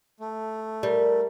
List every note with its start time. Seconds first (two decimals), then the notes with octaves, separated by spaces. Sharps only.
0.20 A3
0.83 G3 A#4